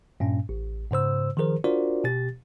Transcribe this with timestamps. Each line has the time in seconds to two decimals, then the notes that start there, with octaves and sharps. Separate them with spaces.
0.20 G2 A#2 C#4
0.49 A1
0.91 G#2 C#3 C5 E6
1.37 D#3 F3 G#4 A#4 C5
1.64 D4 F4 F#4 A#4 C5 D5
2.04 B2 G4 A6